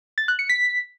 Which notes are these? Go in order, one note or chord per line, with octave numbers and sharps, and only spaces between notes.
A6
F#6
C#7
B6